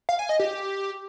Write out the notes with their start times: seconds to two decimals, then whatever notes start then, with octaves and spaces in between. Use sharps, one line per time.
0.09 F5
0.19 G#5
0.29 D#5
0.39 G4